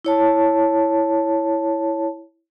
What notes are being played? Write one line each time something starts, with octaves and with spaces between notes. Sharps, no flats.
E4 C#5 A5